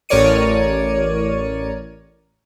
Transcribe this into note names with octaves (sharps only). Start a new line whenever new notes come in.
A1 A#4 C#5 D5 C#7 D#7